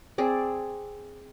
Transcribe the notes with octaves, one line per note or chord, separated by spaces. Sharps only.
C4 G#4 D5